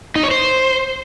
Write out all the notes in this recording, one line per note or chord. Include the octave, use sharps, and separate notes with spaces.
D#4
C#5
C5